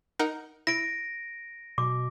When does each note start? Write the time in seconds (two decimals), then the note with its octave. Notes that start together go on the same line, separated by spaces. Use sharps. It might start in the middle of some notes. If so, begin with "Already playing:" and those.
0.19 D#4 A#4 F#5
0.67 E4 A#6 D7
1.78 B2 D6